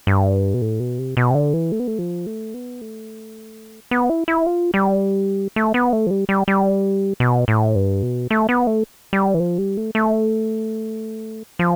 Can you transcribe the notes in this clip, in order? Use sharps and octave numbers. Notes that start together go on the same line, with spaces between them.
G2
B2
A2
B2
C3
B2
C3
D3
E3
A3
B3
A3
F3
A3
B3
A3
B3
E4
E4
F4
G3
A3
B3
A3
F3
G3
G3
G3
B2
A2
G2
B2
A3
B3
A3
G3
E3
F3
G3
A3
A3
F3